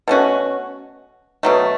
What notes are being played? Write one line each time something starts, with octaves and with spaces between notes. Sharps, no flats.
B2 A3 C#4 F#4
B2 F#3 A3